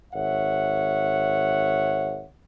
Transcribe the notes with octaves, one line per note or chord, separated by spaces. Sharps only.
G#1 C#5 E5 F#5